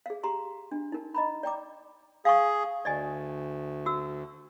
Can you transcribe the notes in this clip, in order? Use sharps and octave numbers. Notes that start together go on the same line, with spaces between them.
G#4 F5
G4 A#5 C6
D4
D#4 A#4
D#5 A#5 B5
D5 G5 A#5 D6
G#4 F5 C#6
D2 D5 D#5 G#5
F#4 E6